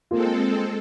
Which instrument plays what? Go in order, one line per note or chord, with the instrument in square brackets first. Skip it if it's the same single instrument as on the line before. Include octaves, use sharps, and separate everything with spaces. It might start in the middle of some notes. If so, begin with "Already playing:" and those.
[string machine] G#3 C4 A4 [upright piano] A#3 F4